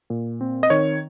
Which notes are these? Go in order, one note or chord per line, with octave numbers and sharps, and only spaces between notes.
A#2
C4
D#5
D#3 C#5